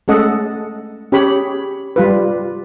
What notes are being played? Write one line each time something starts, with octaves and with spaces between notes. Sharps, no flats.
G#3 A3 C#4 A4 D#5 F#5
C#4 G4 G#4 C#5 B5
G3 F4 B4